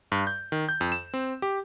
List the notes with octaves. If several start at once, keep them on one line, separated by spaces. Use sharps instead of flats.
G2
G6
D#3
G6
F2
E7
C4
G4